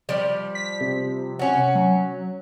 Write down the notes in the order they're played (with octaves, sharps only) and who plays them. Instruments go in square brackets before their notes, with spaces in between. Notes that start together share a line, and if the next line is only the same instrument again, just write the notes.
[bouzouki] F3 G3 D5
[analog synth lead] B6
C3
[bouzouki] C#4 F#4
[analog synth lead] F#3